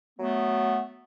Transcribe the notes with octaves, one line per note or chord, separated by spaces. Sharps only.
F#3 A3 B3